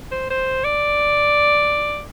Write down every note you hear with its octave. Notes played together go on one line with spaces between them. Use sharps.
C5
C5
D5